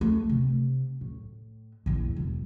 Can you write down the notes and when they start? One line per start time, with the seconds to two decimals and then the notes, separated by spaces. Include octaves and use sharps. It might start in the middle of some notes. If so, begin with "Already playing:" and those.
0.01 A3
0.29 C3
1.01 A2
1.86 A#1 E2
2.16 E1 F#2